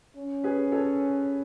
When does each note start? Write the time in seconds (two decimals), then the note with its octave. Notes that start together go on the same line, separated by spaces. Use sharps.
0.16 C#4
0.44 G#4 B4
0.72 A4 C#5